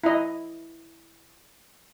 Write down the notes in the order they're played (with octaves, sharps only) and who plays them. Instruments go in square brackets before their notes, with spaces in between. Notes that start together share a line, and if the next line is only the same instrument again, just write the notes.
[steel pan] E4 D#5